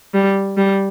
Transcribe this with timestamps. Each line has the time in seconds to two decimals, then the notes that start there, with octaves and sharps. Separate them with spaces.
0.14 G3
0.57 G3